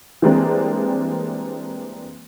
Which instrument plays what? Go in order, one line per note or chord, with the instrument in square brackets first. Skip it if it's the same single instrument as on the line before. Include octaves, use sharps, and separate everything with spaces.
[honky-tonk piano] E3 G3 G#3 A#3 C4 D4